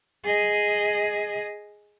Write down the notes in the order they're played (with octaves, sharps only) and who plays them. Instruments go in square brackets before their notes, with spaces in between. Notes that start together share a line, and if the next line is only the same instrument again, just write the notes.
[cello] G#4 D#5